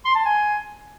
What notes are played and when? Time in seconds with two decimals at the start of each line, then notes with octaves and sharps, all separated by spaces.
0.05 C6
0.15 A5
0.25 G#5